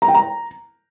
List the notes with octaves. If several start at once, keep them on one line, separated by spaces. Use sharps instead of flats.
A#5
G5
A#5